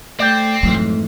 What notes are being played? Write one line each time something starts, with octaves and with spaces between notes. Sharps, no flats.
A3 C4 D5 G5
F2 G#2 E3 F#3 A3